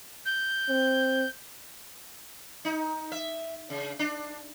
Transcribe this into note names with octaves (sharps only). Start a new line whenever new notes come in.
G6
C4
D#4
E5
C#3
D4